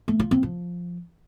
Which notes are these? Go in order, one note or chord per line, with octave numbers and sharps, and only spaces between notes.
A3
F4
C4
F3